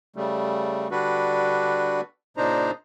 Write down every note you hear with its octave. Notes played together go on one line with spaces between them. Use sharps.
C#3 G3 A3
D3 G3 D4 F#4 B4
A#2 C#3 D4 D#4 C5 A#5